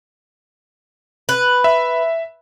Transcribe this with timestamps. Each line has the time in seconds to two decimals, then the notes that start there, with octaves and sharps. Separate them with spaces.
1.29 B4
1.64 E5